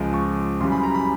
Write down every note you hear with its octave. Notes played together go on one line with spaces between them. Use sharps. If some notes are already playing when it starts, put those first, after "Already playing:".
Already playing: C#2 C#3 F3 G#3
C#6
F#2 C#3 E3 G3 C6
B5
A#5
B5